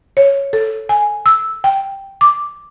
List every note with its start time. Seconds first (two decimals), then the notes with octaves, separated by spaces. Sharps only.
0.17 C#5
0.53 A4
0.89 G#5
1.26 E6
1.64 G5
2.21 D6